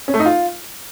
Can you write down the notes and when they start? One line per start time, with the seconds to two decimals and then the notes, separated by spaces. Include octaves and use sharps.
0.08 C#4
0.14 A3
0.20 D#4
0.26 F4